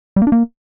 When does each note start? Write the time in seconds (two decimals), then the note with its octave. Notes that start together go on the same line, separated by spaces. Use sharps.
0.16 G3
0.22 A#3
0.27 D4
0.32 A#3